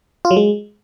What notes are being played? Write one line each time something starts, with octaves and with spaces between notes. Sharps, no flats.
F4
F#3
G#3